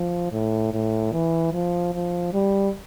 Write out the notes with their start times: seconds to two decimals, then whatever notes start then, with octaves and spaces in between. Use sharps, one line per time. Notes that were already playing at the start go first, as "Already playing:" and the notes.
Already playing: F3
0.32 A2
0.73 A2
1.12 E3
1.53 F3
1.93 F3
2.33 G3